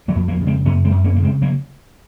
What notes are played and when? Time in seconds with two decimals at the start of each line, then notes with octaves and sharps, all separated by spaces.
0.08 F#3 A#3
0.15 F2
0.28 F#3 A#3
0.41 C#3
0.47 G#3 C4
0.65 F#2 A#3 C#4
0.84 G#3 C4
0.91 F#2
1.05 A#3 C#4
1.15 C#3 A#3
1.24 G#3 C4
1.42 F#3 A#3